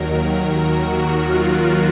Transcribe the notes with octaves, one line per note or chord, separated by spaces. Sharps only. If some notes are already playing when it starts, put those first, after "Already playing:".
Already playing: D#2 D#3 F#3 A#4
F#4
F4